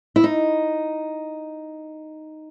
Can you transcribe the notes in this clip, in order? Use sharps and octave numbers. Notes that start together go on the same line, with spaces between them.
E4
D#4